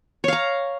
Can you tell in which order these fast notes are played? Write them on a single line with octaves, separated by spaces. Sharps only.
C#5 F5 A#5